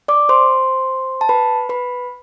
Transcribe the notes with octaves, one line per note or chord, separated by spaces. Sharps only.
D5 D6
C5 C6
A5
B4 B5
B4 B5